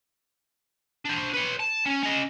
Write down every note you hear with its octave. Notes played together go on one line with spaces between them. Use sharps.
D4 C5
B4 C#5
A5
C#4
C#4 D#5